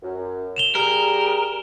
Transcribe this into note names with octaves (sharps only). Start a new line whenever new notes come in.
F#2
E7 F7 G7
G3 G#4 A#4